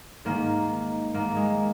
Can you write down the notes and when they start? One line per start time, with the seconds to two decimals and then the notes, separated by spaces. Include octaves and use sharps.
0.25 G#2 D#3 A#3
1.14 G#2 D#3 A#3
1.36 G#3